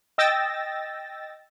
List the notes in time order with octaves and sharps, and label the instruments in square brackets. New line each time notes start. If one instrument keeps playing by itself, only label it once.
[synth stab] D#5 G5 E6 A6 A#6